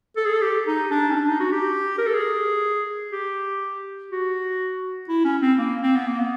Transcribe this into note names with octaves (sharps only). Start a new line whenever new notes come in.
A4
G#4
A4
G4
D#4
D4
C#4
D4
D#4
F#4
G4
A#4
A4
G#4
G4
F#4
E4
C#4
C4
A#3
C4
B3
A#3
B3